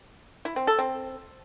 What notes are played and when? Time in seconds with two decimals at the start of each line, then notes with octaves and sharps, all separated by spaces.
0.45 E4
0.56 C4
0.67 A4
0.79 C4